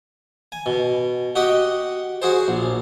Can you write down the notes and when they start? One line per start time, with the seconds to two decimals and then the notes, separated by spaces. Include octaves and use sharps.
0.52 G#5
0.66 B2
1.35 F#4 G4 D#5 F#5
2.22 F#4 G#4 C5
2.48 A#1